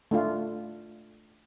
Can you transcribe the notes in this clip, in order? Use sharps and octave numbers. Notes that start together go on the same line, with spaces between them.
A3 D4 F4